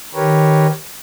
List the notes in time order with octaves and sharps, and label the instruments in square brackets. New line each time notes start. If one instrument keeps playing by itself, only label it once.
[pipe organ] D#3 G4 A#4 B4 C#5